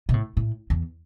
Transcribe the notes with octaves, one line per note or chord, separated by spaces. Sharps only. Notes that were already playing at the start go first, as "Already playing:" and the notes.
B2
A2
A2
E2